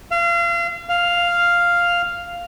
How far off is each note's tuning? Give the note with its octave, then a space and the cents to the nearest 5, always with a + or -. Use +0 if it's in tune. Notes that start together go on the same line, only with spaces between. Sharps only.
F5 -35
F5 +0